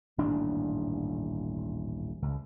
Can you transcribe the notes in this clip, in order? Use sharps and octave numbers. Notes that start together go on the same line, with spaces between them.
D#1 A1 G#2 D4
C#2